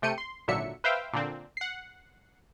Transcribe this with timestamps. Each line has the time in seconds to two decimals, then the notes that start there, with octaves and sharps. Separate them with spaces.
0.02 C3 A3 G5 C#7 D#7
0.18 C6
0.48 G#1 A#2 D3 F#3 E5 C#7
0.84 B4 C5 E5 F5 G5
1.13 A#2 D3 C4
1.57 F#5 C7